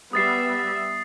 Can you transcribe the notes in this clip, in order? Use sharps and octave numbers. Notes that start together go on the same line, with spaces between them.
G3 B3 E5 D#6 A6 C7